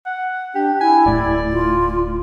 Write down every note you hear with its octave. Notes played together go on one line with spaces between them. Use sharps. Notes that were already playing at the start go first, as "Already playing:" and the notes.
F#5
D4 G4
E4 G#5
D1 A2 D5
F4